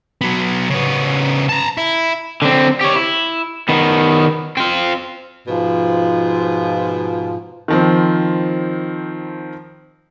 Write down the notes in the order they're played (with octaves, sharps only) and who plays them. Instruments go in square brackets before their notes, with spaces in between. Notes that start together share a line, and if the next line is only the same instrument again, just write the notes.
[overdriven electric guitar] F#3 B3
C#3 B3
A5 A#5
E4
D3 C4
G4 C#5
E4
D#3 B3
C4 F4
[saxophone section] G#2 B2 F3
[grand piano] D#3 F3 C4